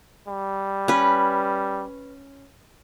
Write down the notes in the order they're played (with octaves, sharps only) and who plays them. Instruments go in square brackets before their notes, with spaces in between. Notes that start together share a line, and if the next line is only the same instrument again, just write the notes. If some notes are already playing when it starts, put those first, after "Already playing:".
[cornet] G3
[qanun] C#4 B4